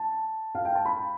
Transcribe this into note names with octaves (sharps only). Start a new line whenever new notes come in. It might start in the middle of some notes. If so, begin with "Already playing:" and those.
Already playing: A5
F5
G5
A5
B5